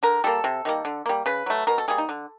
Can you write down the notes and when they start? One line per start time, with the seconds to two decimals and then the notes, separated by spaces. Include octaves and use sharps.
0.03 D3 A#4
0.24 G3 A#3 A4
0.44 C3
0.65 D#3 G3 A#3
0.85 D3
1.06 G3 A#3
1.26 C#3 B4
1.46 F#3 A3
1.67 B2 A#4
1.78 A4
1.88 G3 A#3 G#4
1.98 D#4
2.09 D3